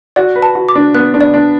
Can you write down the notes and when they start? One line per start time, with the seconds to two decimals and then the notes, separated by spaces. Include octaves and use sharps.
0.16 F#4 D5
0.36 B4
0.42 A5
0.55 F#4
0.69 D6
0.75 D4
0.94 B3 F#6
1.14 D4
1.21 D5
1.34 D4